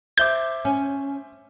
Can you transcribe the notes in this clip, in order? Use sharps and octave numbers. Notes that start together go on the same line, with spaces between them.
C5 E5 D6 G6
C#4